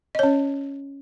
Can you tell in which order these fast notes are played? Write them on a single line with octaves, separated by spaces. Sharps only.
D#5 C#5 C#4